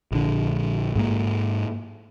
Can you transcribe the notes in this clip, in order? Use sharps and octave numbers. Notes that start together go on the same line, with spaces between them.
A#1 D3
G#2 G#3 A#3